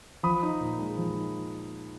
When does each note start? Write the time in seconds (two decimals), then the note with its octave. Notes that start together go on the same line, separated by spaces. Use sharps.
0.23 F3 B5 D#6
0.43 D#4
0.61 A#2
0.79 G#3
0.98 F3
1.16 D#4